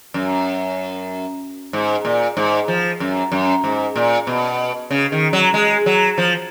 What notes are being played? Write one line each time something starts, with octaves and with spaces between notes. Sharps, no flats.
F#2
G#2
A#2
G#2
F3
F#2
F#2
G#2
A#2
B2
C#3
D#3
F#3
G#3
F#3
F3